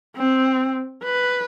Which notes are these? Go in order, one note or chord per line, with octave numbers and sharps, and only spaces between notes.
C4
B4